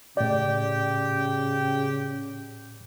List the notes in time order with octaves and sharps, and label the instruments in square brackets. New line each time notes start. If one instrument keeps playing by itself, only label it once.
[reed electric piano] A2 D5 [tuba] C#3 [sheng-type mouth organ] G4 G5